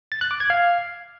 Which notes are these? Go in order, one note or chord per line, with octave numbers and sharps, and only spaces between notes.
A6
F#6
D6
G#6
F5